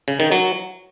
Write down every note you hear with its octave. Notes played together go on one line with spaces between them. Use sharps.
C#3
D#3
F#3